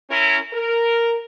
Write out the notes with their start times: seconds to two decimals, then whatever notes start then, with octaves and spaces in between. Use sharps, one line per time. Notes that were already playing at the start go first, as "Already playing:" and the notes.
0.11 C#4 E4 A#4
0.53 A#4